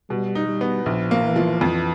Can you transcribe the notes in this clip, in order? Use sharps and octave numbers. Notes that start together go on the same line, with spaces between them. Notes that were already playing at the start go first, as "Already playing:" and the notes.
B2 G3
D#4
G3
B3
A#1 F3
A#3
E3
F3
F2 E3